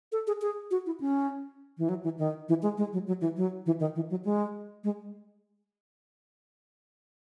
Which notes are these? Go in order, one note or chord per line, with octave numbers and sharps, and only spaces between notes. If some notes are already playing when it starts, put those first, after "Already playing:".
A4
G#4
G#4
F#4
E4
C#4
E3
F#3
E3
D#3
E3
G#3
G#3
F#3
F#3
E3
F#3
E3
D#3
E3
F#3
G#3
G#3